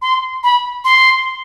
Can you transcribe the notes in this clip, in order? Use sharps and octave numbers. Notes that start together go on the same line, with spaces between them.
C6
B5
C6